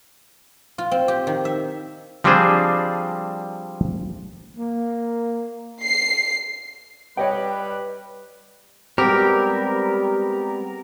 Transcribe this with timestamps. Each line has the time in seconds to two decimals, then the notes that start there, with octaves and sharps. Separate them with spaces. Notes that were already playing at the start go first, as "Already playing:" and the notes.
0.78 F4
0.91 C4
1.08 G4
1.27 D#3
1.45 E5
2.24 F3 G3 C4 D4 G#4 C5
4.56 A#3
5.82 C7
7.17 G3 B4 C#5 D#5 G5
8.98 G3 G#3 B3 C4 G4 A#4